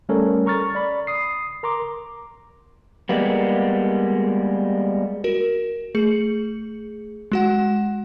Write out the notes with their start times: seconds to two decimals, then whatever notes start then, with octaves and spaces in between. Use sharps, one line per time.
0.09 G3 A3 C#4 A4 A#4 C#5
0.46 A#5 C#6 F6 A6
0.75 D5 B5
1.07 D#6 C7
1.63 A#4 A#5 C6 D6
3.09 G3 G#3 A#3 B3
5.24 F#4 A#4
5.95 A3 G#4 C#7
7.32 G#3 F#4 F#5